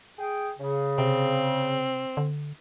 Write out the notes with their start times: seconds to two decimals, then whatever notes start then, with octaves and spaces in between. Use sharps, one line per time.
0.19 G#4 G5
0.58 C#3
0.98 C3 C4
2.17 D3